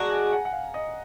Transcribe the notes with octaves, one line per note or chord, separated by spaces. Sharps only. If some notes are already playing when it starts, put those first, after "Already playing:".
Already playing: G#3 D4 F#4 A#5
G#5
G#5
F#5
F#5
F5
D#5